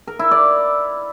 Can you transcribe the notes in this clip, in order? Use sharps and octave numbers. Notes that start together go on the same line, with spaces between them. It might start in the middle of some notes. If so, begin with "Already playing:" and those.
A#4
E4
D5